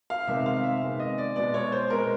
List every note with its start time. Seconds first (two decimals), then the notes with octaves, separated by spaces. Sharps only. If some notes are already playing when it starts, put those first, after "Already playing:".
0.10 F5
0.27 C3 D#3 G#3 B3 E5
0.46 F5
0.64 E5
0.82 C3 D#3 G#3 B3
1.00 D#5
1.18 D5
1.36 B2 G#3 B3 D5
1.54 C#5
1.72 C5
1.90 B2 G#3 B3 A#4